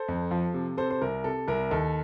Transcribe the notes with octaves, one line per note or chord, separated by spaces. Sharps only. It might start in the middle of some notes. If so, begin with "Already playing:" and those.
Already playing: A4 C5
F2
F3
C3
C3 A4 C5
C5
C2 A#4
C3 A4
C2 A#4
D#2 A4